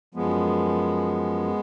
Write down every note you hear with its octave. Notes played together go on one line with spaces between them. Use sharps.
F#2 F3 G#3 B3